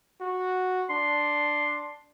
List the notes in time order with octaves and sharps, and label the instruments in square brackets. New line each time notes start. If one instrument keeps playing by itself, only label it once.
[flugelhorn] F#4
[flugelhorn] D4 [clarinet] C6